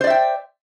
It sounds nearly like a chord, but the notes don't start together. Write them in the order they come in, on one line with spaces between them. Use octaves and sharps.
C5 D5 E5 G5